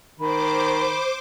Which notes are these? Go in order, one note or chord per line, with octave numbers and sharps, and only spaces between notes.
D#3 C5 B5 D6